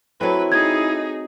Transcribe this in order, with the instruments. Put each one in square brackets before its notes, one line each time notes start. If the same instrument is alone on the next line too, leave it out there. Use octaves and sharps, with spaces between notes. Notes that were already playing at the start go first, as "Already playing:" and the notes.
[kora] F#3 A3 C4 [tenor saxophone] E4 [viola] B4
[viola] D#4 G#4 [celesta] G#6